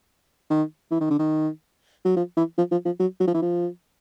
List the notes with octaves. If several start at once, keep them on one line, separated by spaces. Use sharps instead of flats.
D#3
E3
D#3
D3
D#3
F#3
F3
E3
F3
F3
F3
F#3
F#3
F3
E3
F3